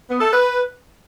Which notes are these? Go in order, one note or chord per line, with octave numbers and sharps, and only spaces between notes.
B3
A4
B4